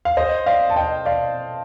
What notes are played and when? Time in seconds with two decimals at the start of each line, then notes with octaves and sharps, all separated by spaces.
0.05 F5
0.17 C5 D#5
0.46 D5 F5
0.70 A5
0.76 D#5 G5
1.05 D5 F5